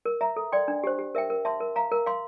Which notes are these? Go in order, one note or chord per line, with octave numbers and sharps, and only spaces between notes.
A#4
E5 A#5
A4
D5 G5 C6
D4
G4 C5
G4
A#4 E5 G5
A#4
E5 A5 C6
A#4
F5 A#5
A#4
F5 C6